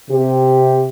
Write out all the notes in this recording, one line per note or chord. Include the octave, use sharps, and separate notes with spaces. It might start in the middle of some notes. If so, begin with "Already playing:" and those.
C3 G4